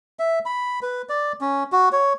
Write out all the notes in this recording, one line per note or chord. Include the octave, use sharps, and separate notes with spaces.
E5
B5
B4
D5
C#4
F#4
C#5